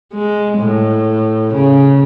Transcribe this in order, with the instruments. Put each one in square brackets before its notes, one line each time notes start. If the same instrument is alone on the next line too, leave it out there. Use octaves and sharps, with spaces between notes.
[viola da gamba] G#3
A2
C#3